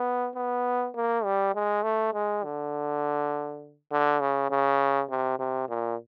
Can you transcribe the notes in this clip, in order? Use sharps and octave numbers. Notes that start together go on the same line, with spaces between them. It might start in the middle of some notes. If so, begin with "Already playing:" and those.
Already playing: B3
B3
A#3
G3
G#3
A3
G#3
D3
D3
C#3
C#3
C3
C3
A#2